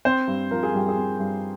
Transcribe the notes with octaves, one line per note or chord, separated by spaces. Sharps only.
C4 C5
G2
F3 A#4
G#4
G2 G4
G#4
C4
G2